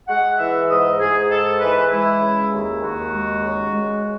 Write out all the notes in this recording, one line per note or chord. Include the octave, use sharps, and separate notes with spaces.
G#3 F#5
E3 E5
G#2 D#5
G#2 G#4
G#3 A4
E3 B4
G#3 E4
C#3
D#2
D#2 F#4
G#3
C#3
G#3
C#3